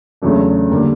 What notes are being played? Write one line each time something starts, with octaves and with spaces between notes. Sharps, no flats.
E2 C#3 F#3 A3 D4
D3 G3 A#3